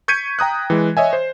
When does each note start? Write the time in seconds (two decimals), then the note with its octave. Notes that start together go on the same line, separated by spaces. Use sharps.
0.08 C#6 G6 G#6 B6 C#7 D#7
0.39 G5 A#5 D#6 F#6
0.70 E3 G#3
0.97 C#5 D#5 E5 G#5
1.13 C5